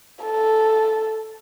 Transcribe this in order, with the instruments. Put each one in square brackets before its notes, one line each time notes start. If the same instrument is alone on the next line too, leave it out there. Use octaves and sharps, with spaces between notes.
[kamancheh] A4